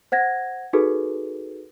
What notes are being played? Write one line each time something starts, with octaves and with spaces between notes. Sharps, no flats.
C5 F#5 G#6 A#6
D#4 F#4 G#4 A4 B4